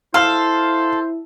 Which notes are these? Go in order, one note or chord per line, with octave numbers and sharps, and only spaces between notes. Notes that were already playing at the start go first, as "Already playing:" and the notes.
E4 A4 C5 F5 C6 F6